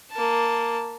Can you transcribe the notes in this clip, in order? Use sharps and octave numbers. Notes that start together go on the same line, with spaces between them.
A#3 A5